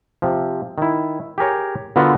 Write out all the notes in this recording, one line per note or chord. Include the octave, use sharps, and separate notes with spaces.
C3 F3
D#3 E4
G4 G#4 A#4 C#5
D3 B3 F4 F#4 A4 A#4